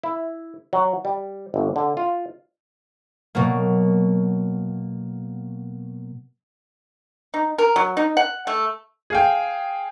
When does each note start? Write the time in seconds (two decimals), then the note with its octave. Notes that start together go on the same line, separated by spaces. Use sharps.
0.04 E4
0.73 F#3
1.05 G3
1.54 G1
1.76 D3
1.97 F4
3.35 B2 F#3 A#3
7.34 D#4
7.58 A#4
7.76 F#3
7.97 D#4
8.17 F#5
8.47 A3
9.10 G#4 F5 G5